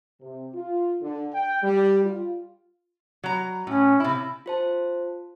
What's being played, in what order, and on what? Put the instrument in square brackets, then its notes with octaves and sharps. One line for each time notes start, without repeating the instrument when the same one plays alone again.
[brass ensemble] C3
F4
D3
G5
G3
F4
[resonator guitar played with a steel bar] F#3 A#5
[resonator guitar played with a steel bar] A2 [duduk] C#4
[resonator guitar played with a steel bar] C3 E4
[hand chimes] F4 C5 A5